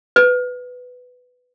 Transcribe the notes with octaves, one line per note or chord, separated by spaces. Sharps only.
B4